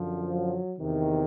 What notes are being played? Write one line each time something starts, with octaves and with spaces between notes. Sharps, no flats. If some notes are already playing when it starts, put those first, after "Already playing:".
Already playing: F#2 D3 F3
F#3
E2 C3 D#3